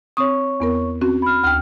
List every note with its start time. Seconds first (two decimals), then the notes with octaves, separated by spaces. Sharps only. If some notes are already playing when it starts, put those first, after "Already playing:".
0.17 C4 C#5 C#6 D#6
0.60 E2 B3 A#4
1.01 C4 C#4 F#4
1.22 B5 F6
1.44 D2 G5 F6